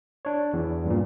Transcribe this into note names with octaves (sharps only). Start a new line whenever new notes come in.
D4 C#5
E2
G2 A#2